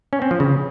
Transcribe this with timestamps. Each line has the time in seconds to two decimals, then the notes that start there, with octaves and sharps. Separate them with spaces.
0.13 C#4
0.22 C4
0.31 F3
0.40 C#3